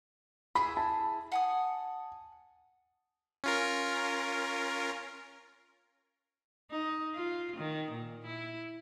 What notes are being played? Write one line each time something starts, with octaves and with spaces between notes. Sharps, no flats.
E4 G#4 E5 B5
A5
F#5 G#5 D#6
C#4 F4 A#4
D#4
F4
D#3
A#2
E4